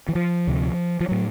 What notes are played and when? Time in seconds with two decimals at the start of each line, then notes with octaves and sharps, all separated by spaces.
0.08 E3
0.15 F3
0.47 D2 C3
1.01 F3
1.08 A2 F#3